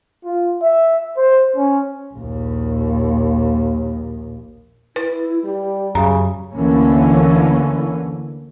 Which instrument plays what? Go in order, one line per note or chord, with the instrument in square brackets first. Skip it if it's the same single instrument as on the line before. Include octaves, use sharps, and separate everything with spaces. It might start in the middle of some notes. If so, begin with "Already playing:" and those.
[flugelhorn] F4
E5
C5
C#4
[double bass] A#1 D#2
[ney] E4 [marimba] B4
[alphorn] G3 [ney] G4
[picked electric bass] F#2 [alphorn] C#3 [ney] G4 [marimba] A#5
[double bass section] D2 D3 E3 A#3 C#4